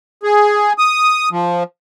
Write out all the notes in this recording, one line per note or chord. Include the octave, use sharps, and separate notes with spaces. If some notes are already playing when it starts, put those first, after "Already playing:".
G#4
D#6
F3